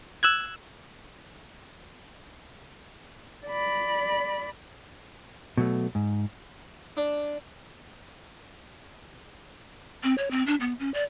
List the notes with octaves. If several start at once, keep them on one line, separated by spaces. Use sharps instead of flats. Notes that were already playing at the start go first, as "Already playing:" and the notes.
E6 F#6 G#6
D5 B5
B2 F#3 A3
G#2
D4
C4
C#5
C4
D4
B3
C#4
D5